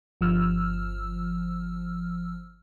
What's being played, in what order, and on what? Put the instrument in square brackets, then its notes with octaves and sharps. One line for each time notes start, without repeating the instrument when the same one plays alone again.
[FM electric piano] G1 F3 E6 F6